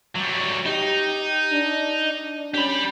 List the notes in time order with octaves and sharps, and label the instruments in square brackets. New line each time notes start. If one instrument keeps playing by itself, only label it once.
[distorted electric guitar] F#3 G3
[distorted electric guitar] D#4 [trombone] G4
[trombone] D4
[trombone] C#4 [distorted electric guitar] G4 B5